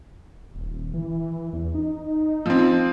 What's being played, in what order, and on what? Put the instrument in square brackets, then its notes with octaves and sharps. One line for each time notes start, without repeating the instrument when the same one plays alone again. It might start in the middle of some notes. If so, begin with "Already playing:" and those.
[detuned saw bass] D#1
E3
E2
D#4
[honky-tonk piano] F3 C4